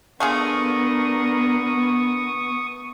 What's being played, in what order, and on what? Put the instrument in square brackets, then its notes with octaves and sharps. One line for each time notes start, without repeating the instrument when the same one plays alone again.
[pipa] A3 F4 G#4 [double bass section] B3 [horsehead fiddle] D4 A#4 [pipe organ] C#6 D#6